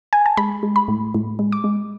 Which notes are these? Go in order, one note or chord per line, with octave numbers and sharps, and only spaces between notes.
G#5
A5
G#3 B5
G#3
B5
A2
A2
G#3
D6
G#3